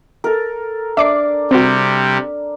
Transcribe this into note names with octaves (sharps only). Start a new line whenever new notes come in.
A4 A#4
D4 E5 D6 C7
C3 G3 C4 F#4